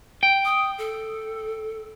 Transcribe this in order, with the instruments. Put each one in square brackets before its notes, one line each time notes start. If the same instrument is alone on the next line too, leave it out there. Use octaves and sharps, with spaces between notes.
[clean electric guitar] G5
[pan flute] D#6
A4